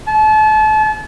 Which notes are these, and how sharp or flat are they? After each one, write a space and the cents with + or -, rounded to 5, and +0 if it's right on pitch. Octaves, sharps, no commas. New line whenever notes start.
A5 -35